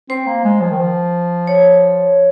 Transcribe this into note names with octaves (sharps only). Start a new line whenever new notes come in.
C4 C5
A#3
G#3
F3
D#3
F3
C#5